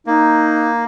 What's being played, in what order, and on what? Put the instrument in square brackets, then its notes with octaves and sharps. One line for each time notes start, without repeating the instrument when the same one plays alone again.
[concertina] A#3 [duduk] D#4